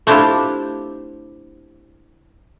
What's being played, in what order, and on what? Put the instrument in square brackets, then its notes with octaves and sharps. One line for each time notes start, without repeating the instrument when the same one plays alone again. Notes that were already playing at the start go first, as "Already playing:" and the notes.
[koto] A3 C4 D4 E4 F4 G4